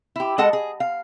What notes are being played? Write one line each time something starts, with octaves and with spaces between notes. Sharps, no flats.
E4 G4
G#3 A4 D#5 F#5 A5
G#4
F5